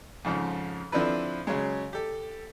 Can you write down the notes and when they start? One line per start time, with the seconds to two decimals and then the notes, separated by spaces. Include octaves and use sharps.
0.25 F2 G#2 C#3 F3
0.92 D3 F3 C4 D4 E4 B4
1.47 C#3 F#3 G#3
1.93 G4 A4